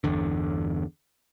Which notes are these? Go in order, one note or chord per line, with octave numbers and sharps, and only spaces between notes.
G1 E2 D3